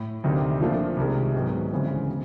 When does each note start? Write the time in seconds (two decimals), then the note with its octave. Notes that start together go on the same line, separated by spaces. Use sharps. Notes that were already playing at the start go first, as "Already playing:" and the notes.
Already playing: A2
0.24 D2 C3 D#3
0.60 A#2 F3 A3 D4 F4
0.97 C2 C3 D#3 G#3
1.34 G#2 D#3 F#3 B3
1.72 D2 C#3 E3 G#3 C4
2.09 B2